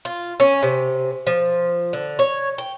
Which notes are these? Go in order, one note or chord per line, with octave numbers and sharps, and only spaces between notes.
F4
C#4
C3
F3
D3
C#5
G5